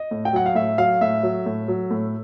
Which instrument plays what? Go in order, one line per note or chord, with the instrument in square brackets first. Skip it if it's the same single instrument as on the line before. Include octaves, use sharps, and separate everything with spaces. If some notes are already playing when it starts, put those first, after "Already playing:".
Already playing: [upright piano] D#5
A2
G5
F#3 F#5
F5
A2 E5
F#3 F5
A2 E5
F#3
A2
F#3
A2